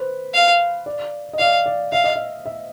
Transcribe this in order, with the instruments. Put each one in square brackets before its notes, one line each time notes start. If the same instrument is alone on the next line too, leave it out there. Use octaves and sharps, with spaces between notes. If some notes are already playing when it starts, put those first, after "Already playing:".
Already playing: [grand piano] B4 C5
[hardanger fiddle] F5
[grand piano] D5
D#5
[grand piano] D5 [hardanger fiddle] F5
[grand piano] D5
[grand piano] E5 [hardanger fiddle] F5
[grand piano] D#5
E5
E5